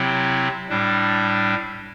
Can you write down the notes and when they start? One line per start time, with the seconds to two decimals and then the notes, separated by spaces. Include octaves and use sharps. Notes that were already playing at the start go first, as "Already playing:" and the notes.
Already playing: C3 F#3 C4 E4
0.69 A2 G3 D4